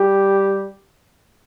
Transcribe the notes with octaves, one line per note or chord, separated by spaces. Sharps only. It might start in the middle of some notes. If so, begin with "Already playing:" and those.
Already playing: G3 G4